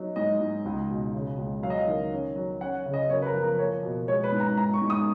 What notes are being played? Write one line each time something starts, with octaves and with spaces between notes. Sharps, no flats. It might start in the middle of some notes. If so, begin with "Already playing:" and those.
Already playing: F#3 D#4
G#2 D#5
G#2
C#2
B2
C#3
C#2
F#3 F5
D#5
F5
D#3
C#4
F#3
C#4 F#5
C#3
D#5
F#2 C#5
B4
A#4
F3
A#4
A#3 C#5
B2
G#3 C#5
B4
G#2
A#5
G#2 A#5
C#6
G#2
D#6